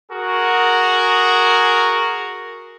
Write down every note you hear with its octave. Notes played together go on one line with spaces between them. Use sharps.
F#4 G#4 A#4